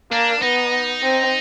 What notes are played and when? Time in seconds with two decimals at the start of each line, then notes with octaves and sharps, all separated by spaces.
0.11 A#3 D4
0.41 B3 D#4
1.03 C4